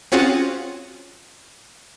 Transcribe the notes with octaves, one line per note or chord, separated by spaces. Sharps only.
C4 C#4 F4 F#4 G#4